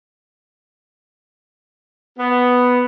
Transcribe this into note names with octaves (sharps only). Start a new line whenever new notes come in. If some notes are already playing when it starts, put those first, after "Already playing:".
B3